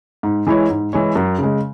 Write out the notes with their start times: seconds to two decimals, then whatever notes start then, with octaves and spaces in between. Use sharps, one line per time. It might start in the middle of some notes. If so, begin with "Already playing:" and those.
0.23 G#2
0.47 E3 G#3 E4 C#5
0.70 G#2
0.93 E3 G#3 E4 C#5
1.15 F#2
1.38 C#3 G#3